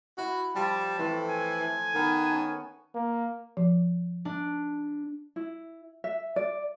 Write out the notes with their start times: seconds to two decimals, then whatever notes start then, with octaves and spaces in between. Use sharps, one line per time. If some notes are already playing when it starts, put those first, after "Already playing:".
0.18 E4 F#4
0.56 F3 G3 A5
0.99 A2 E3 A3 C4
1.30 G#5
1.95 D#3 B3
2.29 C#4 A5
2.95 A#3
3.57 F3
4.25 D4
5.36 E4
6.04 E5
6.36 D5